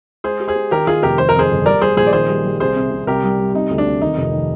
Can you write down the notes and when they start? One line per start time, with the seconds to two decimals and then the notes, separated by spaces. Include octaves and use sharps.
0.24 G#3 G#4 C5
0.40 G4
0.48 G#4 C5
0.56 G#3
0.71 D#3 G4 A#4
0.87 D#3 F4 G#4
1.03 F1 G4 A#4
1.18 D#3 C5
1.29 A#4
1.35 F2 G#4 C5
1.50 G1
1.66 G3 A#4 D5
1.81 G3 G#4 C5
1.97 A#1 G#4 C5
2.07 D5
2.13 D#3 G#4 C5
2.29 G3
2.45 G3
2.60 C2 G#4 C5
2.76 C3
2.91 C3
3.07 C2 G4 A#4
3.23 G3
3.39 G3
3.54 C3 D#4
3.71 D2
3.78 D4
3.86 C3
4.02 D#3 D#4
4.17 F1
4.33 D#3